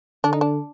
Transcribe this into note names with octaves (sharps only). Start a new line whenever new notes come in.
D3 D4
D#4
D4